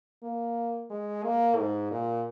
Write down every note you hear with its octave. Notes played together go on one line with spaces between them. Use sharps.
A#3
G#3
A#3
G#2
A#2